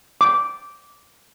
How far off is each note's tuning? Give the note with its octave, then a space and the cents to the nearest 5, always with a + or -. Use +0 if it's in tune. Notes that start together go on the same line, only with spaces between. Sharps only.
D6 -10